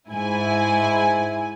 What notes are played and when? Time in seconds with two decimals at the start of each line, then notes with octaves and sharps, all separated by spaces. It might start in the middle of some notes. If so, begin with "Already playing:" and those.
0.11 G#2 E4 G#5